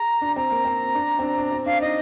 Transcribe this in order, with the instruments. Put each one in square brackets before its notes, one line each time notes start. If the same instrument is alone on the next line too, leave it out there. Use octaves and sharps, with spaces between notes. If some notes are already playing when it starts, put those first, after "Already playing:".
Already playing: [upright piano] G#4 [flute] A#5
[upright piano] D4
[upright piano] C4 [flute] A#5
[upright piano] A#3
C4
D4
C4
D4
D4
C4
[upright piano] D4 [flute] F5
[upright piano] D#4 [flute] D#5